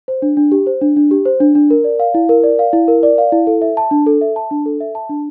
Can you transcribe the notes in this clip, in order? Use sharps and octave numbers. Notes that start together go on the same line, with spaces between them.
C5
D4
D4
G4
C5
D4
D4
G4
C5
D4
D4
A#4
D5
F5
E4
A#4
D5
F5
E4
A#4
D5
F5
E4
A4
E5
A5
D4
A4
E5
A5
D4
A4
E5
A5
D4